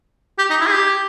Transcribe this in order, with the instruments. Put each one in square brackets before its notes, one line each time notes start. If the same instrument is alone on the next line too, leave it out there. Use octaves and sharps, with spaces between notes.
[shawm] G4
D#4
E4
G#4
G4